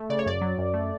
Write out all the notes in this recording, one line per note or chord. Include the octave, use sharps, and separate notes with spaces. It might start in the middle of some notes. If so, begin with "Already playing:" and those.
Already playing: A3
C#3 D5
C#5
F#2 D5
F#3
F#2
A3